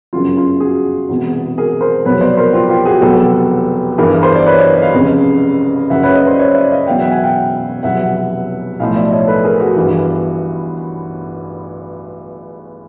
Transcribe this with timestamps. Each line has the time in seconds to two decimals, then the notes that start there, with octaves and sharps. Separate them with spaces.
0.13 G1 F#2 C#3 F#3 F4
0.37 F4
0.60 F#4 G#4
1.08 E1 E2 C3
1.58 G#4 A#4
1.81 A#4 C5
2.05 F1 E2 B2 F#3 B4 C#5
2.21 C5 D5
2.37 A#4 C5
2.53 F4 G4
2.69 F4 G4
2.85 F#4 G#4
3.01 F1 E2 B2 F#3 G4 A4
3.98 G1 G2 E3 G#4 A#4
4.22 A#4 C5
4.35 D5
4.46 B4 C#5
4.58 C#5 D#5
4.82 D#5 F5
4.94 F1 F2 C#3
5.90 F#1 F#2 C#3 E5 F#5
6.03 B4 C#5
6.15 C#5 D#5
6.27 C5 D5
6.39 C#5 D#5
6.54 D5 E5
6.71 D#5 F5
6.87 E1 E2 B2 F#3 F5 G5
6.99 E5 F#5
7.11 F#5 G#5
7.23 F5 G5
7.83 F1 E2 B2 F#3 E5 F#5
8.80 B1 A2 F3 D#5 F5
8.96 D5 E5
9.11 C#5 D#5
9.27 A4 B4
9.44 G#4 A#4
9.60 F#4 G#4
9.76 G1 G2 E3